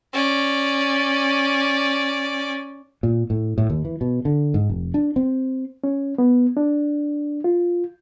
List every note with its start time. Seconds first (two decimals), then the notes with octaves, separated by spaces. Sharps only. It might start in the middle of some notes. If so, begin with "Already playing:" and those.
0.13 C#4 D5
3.03 A#2
3.30 A2
3.58 A2
3.70 D#2
3.85 E3
4.01 B2
4.25 D3
4.54 G#2
4.70 F1
4.94 D4
5.16 C4
5.84 C#4
6.18 B3
6.57 D4
7.44 F4